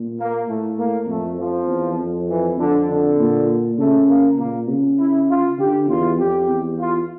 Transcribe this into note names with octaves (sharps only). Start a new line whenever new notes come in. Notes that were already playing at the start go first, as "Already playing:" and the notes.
Already playing: A#2
A#3
A2 A3
A#3
F2 A3
F3
E2
F2
E3
F2 D3
D3
A#2
C#3 A3
A#3
A#2 A#3
C#3
E4
F4
D3 G4
E2 F4
F2 G4
E2
F4